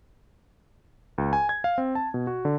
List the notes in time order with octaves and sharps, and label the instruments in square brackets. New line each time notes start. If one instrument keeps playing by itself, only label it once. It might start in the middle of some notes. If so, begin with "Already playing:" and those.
[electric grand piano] C#2
G#5
G#6
F5
C4
A5
B2
F#4
D3